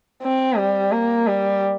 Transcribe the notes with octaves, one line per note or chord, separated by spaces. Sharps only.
C4
G3
A#3
G3